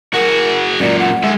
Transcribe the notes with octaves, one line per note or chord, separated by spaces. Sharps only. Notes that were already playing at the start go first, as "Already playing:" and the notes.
F#4 G#4 A#4
F#2 A#2 D5
F#5
G#3 E5